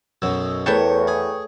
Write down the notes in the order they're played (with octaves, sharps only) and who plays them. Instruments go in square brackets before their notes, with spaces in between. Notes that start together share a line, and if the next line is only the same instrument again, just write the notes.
[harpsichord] B1 F#2 B2 [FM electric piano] E6
[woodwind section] E2 [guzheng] A3 C#5 A5 [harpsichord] A#4 [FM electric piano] B4 G5 C#6
[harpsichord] G#4